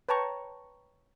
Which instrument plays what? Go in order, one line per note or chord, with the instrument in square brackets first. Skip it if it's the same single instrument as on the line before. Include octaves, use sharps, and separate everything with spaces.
[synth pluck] B4 C#5 G5 A5 A#5 C#6